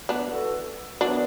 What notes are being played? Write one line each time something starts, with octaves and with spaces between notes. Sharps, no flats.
B3 D4
E3 B3 F#4 A4
F#2 E3 B3 D4 F#4